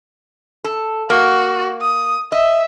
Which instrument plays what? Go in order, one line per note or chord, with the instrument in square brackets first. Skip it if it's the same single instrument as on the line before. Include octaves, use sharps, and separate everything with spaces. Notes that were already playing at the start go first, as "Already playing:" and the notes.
[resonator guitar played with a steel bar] A4
[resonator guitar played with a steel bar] A#3 [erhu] F#4
[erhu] D#6
[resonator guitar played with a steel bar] D#5 [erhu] E5